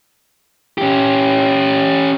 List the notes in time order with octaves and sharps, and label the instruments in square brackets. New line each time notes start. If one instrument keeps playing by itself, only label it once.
[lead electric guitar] C#4 G4